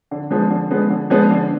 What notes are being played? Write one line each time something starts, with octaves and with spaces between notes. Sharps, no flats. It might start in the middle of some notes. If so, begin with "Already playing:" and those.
D3
F3 G#3 B3
D3
F3 G#3 B3
D3
F3 G#3 B3
D3